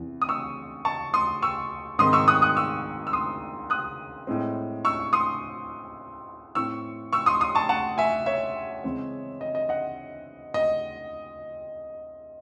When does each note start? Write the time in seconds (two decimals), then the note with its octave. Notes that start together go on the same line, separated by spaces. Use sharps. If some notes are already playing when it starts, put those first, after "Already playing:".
Already playing: E2 C3 E3
0.22 D#6
0.29 C#6 E6
0.85 A5 C#6
1.14 C6 D#6
1.42 C#6 E6
1.99 G#2 D#3 G#3 C4 C6 D#6
2.13 C#6 E6
2.28 D#6 F#6
2.42 D#6 F#6
2.56 C#6 E6
3.07 E6
3.13 C6 D#6
3.70 D#6 F#6
4.27 A2 G#3 C4
4.85 C#6 E6
5.13 C6 D#6
6.55 A2 E3 C4 C#6 E6
7.12 C#6 E6
7.26 C6 D#6
7.41 C6 D#6
7.55 A5 C#6
7.69 F#5 A5
7.98 E5 G#5
8.26 C#5 E5
8.84 E2 C#3 G#3 C4
9.41 D#5
9.55 D#5
9.69 D#5 F#5
10.54 D#5